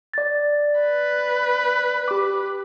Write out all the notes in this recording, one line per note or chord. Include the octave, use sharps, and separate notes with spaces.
D5 A6
B4
G4 D6